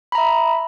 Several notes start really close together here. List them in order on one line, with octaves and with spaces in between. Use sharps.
B5 A#5 E5